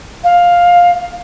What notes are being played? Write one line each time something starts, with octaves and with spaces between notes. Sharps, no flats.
F5